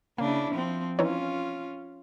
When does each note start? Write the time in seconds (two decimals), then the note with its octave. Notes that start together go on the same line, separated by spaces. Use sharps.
0.18 C#3 A#3 D4 E4
0.51 F3 C4
0.99 E3 C#4 D#4 F4 C#5